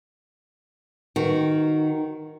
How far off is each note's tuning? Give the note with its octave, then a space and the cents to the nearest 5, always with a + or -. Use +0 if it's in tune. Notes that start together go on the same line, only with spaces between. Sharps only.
D#3 -5 F#4 +0